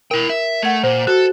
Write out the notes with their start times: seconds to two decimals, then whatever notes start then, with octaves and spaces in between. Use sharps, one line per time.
0.11 E4 A#4 G5
0.29 E5
0.63 A3 F#5 G#6
0.83 A#2 C5
1.07 F#4 A4